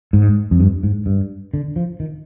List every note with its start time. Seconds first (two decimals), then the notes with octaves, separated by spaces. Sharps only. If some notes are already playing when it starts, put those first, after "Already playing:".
0.13 G#2
0.51 F2
0.60 G2
0.83 G#2
1.06 G2
1.54 D3
1.76 F3
2.00 D#3